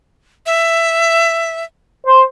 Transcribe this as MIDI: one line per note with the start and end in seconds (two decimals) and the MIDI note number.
0.46 1.64 76
2.06 2.21 72